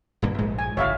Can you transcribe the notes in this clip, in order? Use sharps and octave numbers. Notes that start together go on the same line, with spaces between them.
D#1 G2 A#3
A#1 G#2 G#3
G#5
F#1 F2 C#5 E5 F5